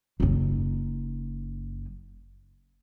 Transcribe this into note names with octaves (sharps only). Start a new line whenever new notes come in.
F#1 D#4